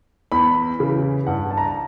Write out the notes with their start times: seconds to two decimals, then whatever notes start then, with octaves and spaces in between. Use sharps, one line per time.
0.32 E2 B5
0.80 C#3 E3
1.27 G2 F#5
1.51 A5
1.57 A#5
1.64 A5